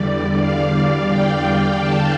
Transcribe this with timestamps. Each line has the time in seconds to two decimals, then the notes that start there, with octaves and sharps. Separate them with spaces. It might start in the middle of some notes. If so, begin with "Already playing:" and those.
Already playing: E2 D3 G3 D5
0.39 F5
1.10 G5
1.81 A5